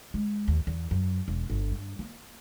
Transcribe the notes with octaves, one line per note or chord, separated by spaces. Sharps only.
G#3
D#2
E2
F#2
E1
G1
G2
A#3